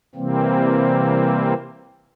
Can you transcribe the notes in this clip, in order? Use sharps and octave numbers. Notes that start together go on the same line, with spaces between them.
C3 E3 G3 A#3 C4